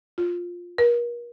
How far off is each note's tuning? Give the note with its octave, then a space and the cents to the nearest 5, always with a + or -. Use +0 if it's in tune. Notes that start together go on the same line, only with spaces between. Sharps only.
F4 +10
A#4 +40